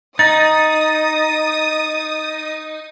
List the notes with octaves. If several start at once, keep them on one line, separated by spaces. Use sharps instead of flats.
D#4 D#6 A6